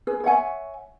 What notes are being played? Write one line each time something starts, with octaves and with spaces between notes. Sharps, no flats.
G#4 B4
C#5 E5 F#5 G#5